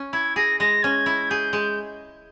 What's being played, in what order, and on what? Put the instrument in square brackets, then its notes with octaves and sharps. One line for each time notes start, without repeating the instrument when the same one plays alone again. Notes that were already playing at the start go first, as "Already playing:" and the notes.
Already playing: [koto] C#4
[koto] E4 [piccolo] G#6
[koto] G#4 [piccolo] A#6
[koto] G#3 [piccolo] A#6
[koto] C#4 [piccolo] G#6
[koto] E4
[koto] G#4 [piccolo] G6
[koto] G#3